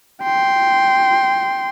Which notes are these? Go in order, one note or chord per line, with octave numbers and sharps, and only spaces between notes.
G5 C6